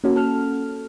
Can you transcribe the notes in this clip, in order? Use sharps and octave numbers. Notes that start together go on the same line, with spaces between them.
A#3 C#4 F#4
A4 F6